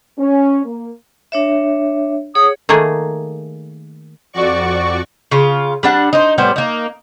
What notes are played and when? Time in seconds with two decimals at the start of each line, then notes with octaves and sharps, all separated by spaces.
0.19 C#4
0.65 A#3
1.32 D4 C#5 E5
2.35 G#4 C#5 F#5 D#6
2.69 D#3 A3 A#3 G#4
4.33 F2 F#4 D5 C#6
5.31 C#3 F4
5.83 G3 D4 F#5
6.13 D#4 C5
6.38 A2 G3 B3 C5
6.56 A#3 D#4